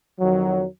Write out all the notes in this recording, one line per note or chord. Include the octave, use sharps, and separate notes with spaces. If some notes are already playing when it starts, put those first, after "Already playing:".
F2 D#3 F#3